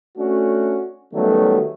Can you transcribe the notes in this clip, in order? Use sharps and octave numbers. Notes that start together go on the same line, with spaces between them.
A3 C#4 D4 F#4
D#3 F#3 G3 A3 B3 C#4